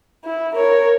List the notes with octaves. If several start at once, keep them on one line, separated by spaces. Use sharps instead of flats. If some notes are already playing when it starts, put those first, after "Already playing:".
E4
A#4 C#5